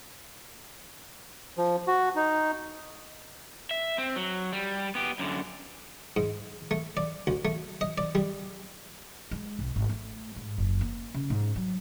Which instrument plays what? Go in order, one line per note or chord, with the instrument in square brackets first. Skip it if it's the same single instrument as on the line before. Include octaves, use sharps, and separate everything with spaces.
[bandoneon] F3
F#4
D#4
[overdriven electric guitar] E5
C4
F#3
G3
B3 G4
F#2 D3
[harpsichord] G#2
A3
D5
D2
A3
D#5
D5
G3
[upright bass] G#3
B1
G#1
A3
G#2
F#1
A#3
C#3
G#2
F#3